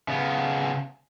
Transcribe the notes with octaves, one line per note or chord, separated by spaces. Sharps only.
C#3 B3